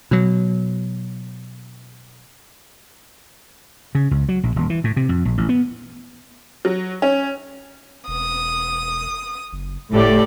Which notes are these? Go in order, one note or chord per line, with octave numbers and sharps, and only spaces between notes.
B2 F#3
C#3
C#2
F#3
A#1
D#1
E3
A2
C3
F2
A#1
A1
B3
F#3
C#4
E1 D#6
F#1
F#1 A2 G4 A4 D5